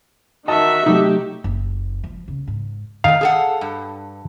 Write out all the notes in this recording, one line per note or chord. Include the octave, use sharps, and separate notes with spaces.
D#3 F#4 D#5 E5 A5
C3 F#3 A3 D#4 G4
F#1
F3
C#3
G#2
D#3 A3 F5
G#4 A4 F#5
G2